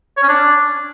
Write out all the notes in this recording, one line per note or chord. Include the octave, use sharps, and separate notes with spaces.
C#5
C#4
D4